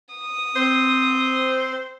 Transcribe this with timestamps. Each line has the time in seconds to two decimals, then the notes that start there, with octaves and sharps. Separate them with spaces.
0.15 D#6
0.56 C4 C5